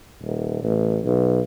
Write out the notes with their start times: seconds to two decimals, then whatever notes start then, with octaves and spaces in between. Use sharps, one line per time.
0.22 D#1
0.63 A1
1.04 B1